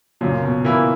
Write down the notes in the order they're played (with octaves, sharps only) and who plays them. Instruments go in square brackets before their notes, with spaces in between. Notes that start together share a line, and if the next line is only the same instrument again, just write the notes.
[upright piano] F#2 [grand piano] A#2 C#3
[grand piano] B2
[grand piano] A#2 [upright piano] E3 A#3 E4